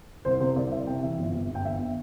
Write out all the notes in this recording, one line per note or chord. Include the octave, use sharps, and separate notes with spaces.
C2 C5
C3 C5
C2 D5
C2 E5
C3 G5
E3 E5
G1
G1
G1
G5
G1 E5